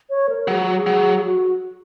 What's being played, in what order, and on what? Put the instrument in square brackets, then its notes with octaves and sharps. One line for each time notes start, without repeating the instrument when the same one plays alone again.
[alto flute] C#5
A#4
[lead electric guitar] F#3 [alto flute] G#4
[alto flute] F#4
G#4
[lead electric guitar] F#3
[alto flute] G#4
F#4